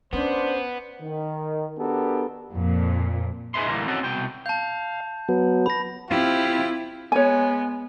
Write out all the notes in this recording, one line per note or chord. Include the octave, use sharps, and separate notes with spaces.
B3 C#4 D4 C5
D#3
B3 D4 F#4 G4 A4 A#4
F2 A#2
D#4 G#4 B4 E5 C6
D2 A2 E3 G3 A#3
C4 C#4 D#4 F#4 A4
C2 B2 G5
F5 A5 G6
F#3 B3
B5 A#6
C4 E4 F4 G4
G#3 B3 C#5 G#5